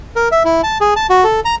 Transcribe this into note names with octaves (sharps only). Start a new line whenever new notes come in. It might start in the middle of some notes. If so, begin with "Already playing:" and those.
A#4
E5
E4
A5
G#4
A5
F#4
A4
A#5